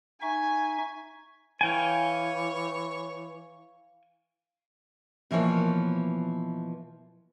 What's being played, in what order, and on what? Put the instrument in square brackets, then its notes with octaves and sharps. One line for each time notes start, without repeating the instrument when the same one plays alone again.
[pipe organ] D#4 E5 C#6 [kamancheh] G#5
[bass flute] E3 [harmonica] C#5 [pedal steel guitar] F5 G5 G#5
[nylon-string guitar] B2 E3 F3 A#3 C#5